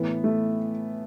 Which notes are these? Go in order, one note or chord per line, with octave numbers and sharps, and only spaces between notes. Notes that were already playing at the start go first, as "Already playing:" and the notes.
Already playing: A2 E3 B3
A3